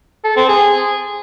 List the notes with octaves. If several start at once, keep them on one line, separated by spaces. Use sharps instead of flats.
A4
C4
G#4